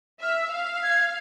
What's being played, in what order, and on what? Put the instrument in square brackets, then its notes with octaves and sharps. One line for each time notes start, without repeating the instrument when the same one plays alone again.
[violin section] E5 [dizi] F6
[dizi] E6
[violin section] F5
[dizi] F6
G#6